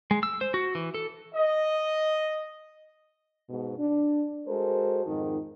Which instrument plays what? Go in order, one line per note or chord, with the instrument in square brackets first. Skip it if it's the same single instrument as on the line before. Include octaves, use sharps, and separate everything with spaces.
[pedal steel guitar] G#3
E6
C5
F#4
E3
A4
[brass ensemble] D#5
[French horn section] G#2 B2
D4
G#3 F#4 A4 A#4 C5
F2 G#2 D#3